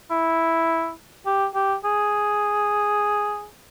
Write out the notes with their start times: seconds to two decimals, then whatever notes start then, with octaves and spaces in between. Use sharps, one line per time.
0.11 E4
1.26 G4
1.55 G4
1.85 G#4